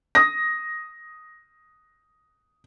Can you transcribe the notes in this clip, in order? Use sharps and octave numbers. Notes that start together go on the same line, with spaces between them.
D#6 A#6